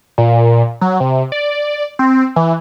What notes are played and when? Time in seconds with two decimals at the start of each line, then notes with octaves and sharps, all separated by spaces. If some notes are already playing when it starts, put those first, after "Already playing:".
0.18 A#2
0.81 F#3
1.00 C3
1.32 D5
1.99 C4
2.36 E3